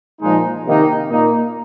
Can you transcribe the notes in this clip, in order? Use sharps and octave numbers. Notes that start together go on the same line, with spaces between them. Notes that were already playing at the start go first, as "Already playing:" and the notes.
A#2 F3 G#3 D#4
C3 D#3 A#3 D#4
A#2 A#3 D#4